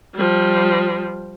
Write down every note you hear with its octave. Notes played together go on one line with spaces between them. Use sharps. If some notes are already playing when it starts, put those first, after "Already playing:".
F3 G3